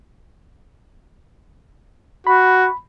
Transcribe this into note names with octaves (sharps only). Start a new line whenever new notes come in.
F#4 B5